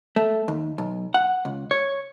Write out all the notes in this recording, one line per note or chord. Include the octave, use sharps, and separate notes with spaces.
A3
D#2
B1
F#5
C#2
C#5